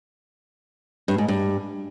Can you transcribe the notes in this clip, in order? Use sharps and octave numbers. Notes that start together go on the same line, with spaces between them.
G2
G#2
G2